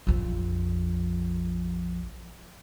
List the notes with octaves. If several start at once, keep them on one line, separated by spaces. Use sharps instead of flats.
A#1 F2